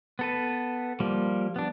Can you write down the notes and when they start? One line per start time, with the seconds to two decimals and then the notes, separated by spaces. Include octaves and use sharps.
0.19 B3 A4 B4
1.00 F3 G3 A#3
1.56 B3 D4